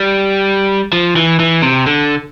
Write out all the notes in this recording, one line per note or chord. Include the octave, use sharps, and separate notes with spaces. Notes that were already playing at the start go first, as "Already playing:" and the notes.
Already playing: G3
F3
E3
E3
C3
D3